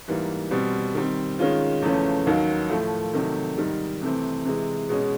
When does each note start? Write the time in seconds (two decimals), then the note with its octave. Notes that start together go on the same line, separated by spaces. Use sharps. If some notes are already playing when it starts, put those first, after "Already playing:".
0.08 G#2 E3 G3 A#3
0.51 B2 G3 C4
0.95 D#3 G3 C4
1.39 D#3 G#3 C#4 F4
1.82 E2 C#3 F3 A3 C#4
2.27 D#2 D#3 F#3
2.70 A2 F3 A3
3.13 C3 D#3 F#3 A3
3.58 G#2 D#3 G3
4.01 C3 E3 A3 C4
4.45 C3 E3 G#3
4.89 B2 G#3 C#4